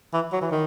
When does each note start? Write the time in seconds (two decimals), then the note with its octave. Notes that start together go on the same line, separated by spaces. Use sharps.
0.13 E3
0.33 F#3
0.41 E3
0.51 D#3